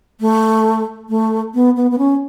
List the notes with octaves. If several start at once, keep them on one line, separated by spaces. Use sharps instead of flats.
A3
A3
B3
B3
B3
C#4